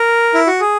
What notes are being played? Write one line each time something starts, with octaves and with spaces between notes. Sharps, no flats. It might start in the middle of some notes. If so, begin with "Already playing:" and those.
Already playing: A#4
E4
F#4
G#4